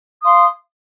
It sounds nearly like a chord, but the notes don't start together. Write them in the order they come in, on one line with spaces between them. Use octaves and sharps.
D#6 F5 C6